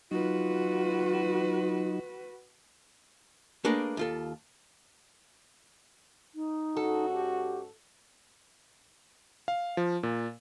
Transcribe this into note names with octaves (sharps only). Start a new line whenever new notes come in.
F#3 D#4 F4 F#4 B4
A3 A#3 D4 G#4 A#4 B4
D#2 F4 A4
D#4
G#2 C#4 F#4 A4
G4
F5
F3
A#2